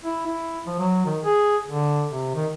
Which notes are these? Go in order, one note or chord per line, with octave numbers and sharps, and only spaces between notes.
E4
E4
F3
F#3
D#3
G#4
D3
C3
D#3